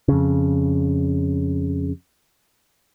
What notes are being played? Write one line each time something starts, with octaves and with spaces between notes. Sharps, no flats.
F2 C#3